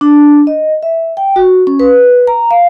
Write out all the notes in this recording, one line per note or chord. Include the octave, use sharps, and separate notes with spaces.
D4
D#5
E5
G5
F#4
C#4
B4
A#5
F5